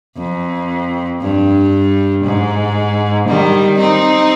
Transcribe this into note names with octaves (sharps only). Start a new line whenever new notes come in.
F2
G2
G#2
D#3 G3
C4 D#4